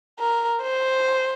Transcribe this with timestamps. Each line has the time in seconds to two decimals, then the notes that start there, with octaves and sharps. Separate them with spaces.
0.19 A#4
0.62 C5